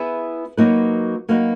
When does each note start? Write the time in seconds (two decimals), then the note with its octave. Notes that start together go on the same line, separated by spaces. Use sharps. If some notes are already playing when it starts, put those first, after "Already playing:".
Already playing: B3 E4 G#4 B4 E5
0.57 F#3 A#3 D#4 F#4 B4
1.29 F#3 A#3 D#4 F#4 B4